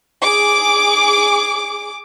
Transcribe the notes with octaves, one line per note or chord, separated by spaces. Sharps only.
G#4 D6